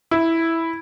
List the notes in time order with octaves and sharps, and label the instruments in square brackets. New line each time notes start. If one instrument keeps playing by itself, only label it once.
[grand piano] E4